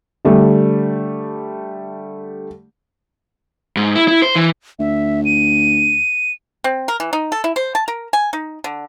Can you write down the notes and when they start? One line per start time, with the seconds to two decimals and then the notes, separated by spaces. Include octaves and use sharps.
0.25 D3 G3 A3
3.77 G#2
3.96 E4
4.08 E4
4.22 C5
4.36 E3
4.79 D2 E5
5.25 D#7
6.64 C4
6.88 A#4
7.00 E3
7.13 D#4
7.32 A4
7.44 E4
7.56 C5
7.75 A5
7.88 A#4
8.13 G#5
8.33 D#4
8.64 D3